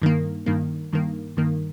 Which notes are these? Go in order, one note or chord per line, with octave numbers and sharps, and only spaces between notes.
G2 D#3 A#3
G2 D#3 A#3
G2 D#3 A#3
G2 D#3 A#3